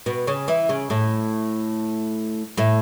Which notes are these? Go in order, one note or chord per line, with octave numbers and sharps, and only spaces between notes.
B2 B3
C#3 C#4
E3 E4
C#3 C#4
A2 A3
A2 A3